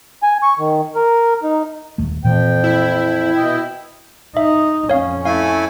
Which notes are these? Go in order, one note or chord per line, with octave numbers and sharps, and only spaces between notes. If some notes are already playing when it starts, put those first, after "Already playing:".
G#5
C#6
D#3
A#4
D#4
D#1 D#2 A3
F2 A#2 E3 F3 G5
E4
B2 D#5 G5
D#4 E5
F2 C#4 C#5 F5
A3 E4 F5 G#5